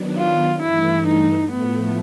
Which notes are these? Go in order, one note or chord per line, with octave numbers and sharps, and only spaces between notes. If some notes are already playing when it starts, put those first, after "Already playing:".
Already playing: D#3 F#3 B3 D4
F4
G2 E3 A3 E4
D#4
A2 F3 A3 B3